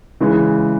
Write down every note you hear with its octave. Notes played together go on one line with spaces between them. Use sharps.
C#3 E3 G#3